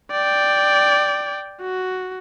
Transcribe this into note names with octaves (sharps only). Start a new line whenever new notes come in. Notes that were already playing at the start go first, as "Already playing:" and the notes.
D5 G5
F#4